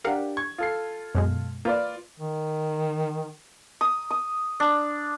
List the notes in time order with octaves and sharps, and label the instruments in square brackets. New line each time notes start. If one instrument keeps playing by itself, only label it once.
[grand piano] D4 G4 [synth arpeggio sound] A#4 F5 F#5
[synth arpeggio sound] C#6 [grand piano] G#6
[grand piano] F4 A4 C7
[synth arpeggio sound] F#2 B2 G#3
[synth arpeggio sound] A#3 [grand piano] F4 B4 D5
[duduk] D#3
[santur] D#6
D#6
D4